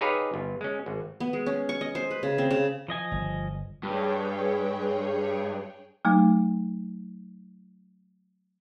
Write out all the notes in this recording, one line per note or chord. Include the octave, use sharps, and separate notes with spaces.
D#4 G4 G#4 B4 C#5 F5
G1
G#3 C#4
G#1
B3
G#3
C#4
C#6
D#5
C5
B4
C#3
C4
C#3
F3 D#5 G#5
G1
G2 G#4 C#5 G5
F#3 A3 D#4